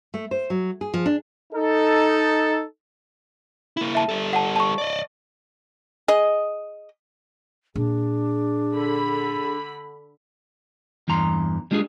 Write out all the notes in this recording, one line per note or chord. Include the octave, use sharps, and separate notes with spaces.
A3
C5
F#3
G#4
F3
D4
D#4 A4
A#3 E4
E5 A5
G3 A4
F#5 A5
A5 C#6
D5 D#5
G#4 D#5
A#2 D4 G#4
D3 B5
E2 G2 E3 A#5 C6
G3 G#3 D4 F4 F#4 G#4